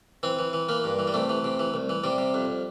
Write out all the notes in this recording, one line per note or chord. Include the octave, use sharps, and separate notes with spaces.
E3 C4
E3
E3
E3 A#3
G2
E3
G3
C3 A3
E3
C3
E3
C2
E3
C3 G3
C3
F2